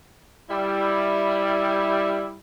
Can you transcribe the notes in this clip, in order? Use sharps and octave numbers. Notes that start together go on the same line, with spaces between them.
G3 E4